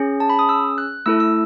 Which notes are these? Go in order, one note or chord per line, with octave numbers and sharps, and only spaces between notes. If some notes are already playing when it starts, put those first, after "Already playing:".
Already playing: C#4 G#4
A5
B5
D#6
E6
F#6
A3 E4 A4 E6
E6